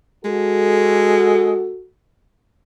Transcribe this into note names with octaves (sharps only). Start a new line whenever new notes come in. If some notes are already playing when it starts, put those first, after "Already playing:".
G#3 F#4 A4